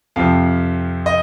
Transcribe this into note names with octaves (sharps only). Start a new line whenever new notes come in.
F2 C3 F3 F5
D#5